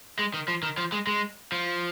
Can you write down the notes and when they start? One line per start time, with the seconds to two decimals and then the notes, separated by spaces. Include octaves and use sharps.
0.19 G#3
0.34 D#3
0.48 F3
0.63 D#3
0.78 F3
0.92 G#3
1.07 G#3
1.52 F3